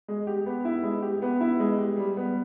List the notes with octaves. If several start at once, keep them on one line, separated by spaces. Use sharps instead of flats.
G#3
G4
B3
E4
G#3
G4
B3
E4
G#3
G4
G3
B3